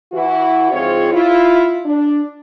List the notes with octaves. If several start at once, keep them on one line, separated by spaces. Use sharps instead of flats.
E3 E4 F#4
G#2 F3 C4 F4 G#4 C#5
E4 F4
D4